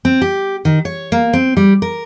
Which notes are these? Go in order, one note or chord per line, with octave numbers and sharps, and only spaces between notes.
C4
G4
D#3
C#5
A#3
C4
G3
A#4